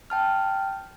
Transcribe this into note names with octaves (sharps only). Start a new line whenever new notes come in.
G5 A5 F6